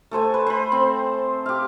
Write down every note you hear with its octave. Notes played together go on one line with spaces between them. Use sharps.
A3 A4 C5 G#5
B4
C5 B5
C4
G4 F5